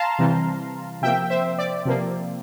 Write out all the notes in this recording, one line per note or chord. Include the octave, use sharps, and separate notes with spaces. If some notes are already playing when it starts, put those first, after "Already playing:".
Already playing: F5 A5 A#5 C6
C3 E3 G3
C3 F3 A#3 E5 G5
C5 E5
D5
C3 F3 A#3